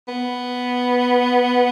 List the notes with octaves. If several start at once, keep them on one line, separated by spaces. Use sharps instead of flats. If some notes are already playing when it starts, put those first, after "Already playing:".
B3